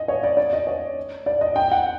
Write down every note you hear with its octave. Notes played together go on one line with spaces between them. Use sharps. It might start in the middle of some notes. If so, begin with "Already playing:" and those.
Already playing: D#5
C#5
D5
D5
D#5
C#5
D5
D#5
G5
F#5